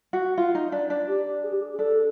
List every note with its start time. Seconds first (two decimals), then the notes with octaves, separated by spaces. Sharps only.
0.13 F#4
0.38 F4
0.55 D#4
0.72 D4
0.90 D4
1.08 G4
1.44 G#4
1.53 G4
1.62 G#4
1.74 G#4
1.79 D4 A4